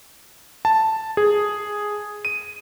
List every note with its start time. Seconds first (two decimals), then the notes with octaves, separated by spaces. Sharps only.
0.65 A5
1.17 G#4
2.25 D#7